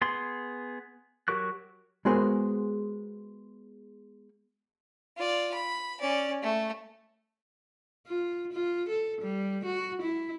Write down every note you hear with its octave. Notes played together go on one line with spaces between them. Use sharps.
B3 G#4 C6
F#3 G4 A#4 C#6 F#6
G#3 B3 F#4 G#4 A#4 C5
F4 D5
B5
C#4 D5
A3
F4
F4
A4
G3
F#4
E4